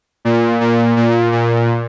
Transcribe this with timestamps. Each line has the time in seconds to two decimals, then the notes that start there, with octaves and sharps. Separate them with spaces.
0.25 A#2
0.61 A#2
0.96 A#2
1.32 A#2